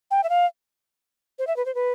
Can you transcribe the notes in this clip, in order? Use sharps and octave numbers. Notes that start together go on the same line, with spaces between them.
G5
E5
F5
C5
E5
B4
C5
B4